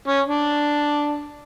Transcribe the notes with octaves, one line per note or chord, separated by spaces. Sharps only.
C#4
D4